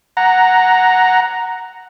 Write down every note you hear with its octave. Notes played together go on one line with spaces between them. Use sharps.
F#5 A#5